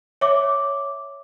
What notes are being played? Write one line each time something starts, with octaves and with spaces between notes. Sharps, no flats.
C#5 E5 D6